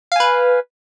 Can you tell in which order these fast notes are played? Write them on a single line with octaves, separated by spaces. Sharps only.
F5 G#5 B4